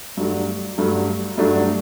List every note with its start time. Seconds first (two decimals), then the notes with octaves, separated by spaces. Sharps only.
0.17 G2 F#3 A3 D4
0.78 G2 F#3 A3 D4
1.37 G2 F#3 A3 D4